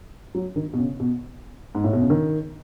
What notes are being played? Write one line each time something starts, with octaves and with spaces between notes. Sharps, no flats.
F#3
D#3
B2
C#3
B2
G#2
A2
B2
C#3
D#3